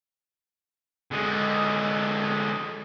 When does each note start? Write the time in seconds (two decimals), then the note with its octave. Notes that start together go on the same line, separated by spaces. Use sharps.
1.11 D3 G#3